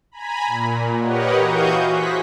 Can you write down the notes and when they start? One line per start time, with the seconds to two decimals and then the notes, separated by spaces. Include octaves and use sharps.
0.11 G#5 A#5 B5
0.47 A#2
0.99 G4 A#4 B4 C#5 D#5 F#5
1.36 E3 F#4 F5 C#6 D#6 G6
1.87 G#4 C5 G#5 F#6 A#6 B6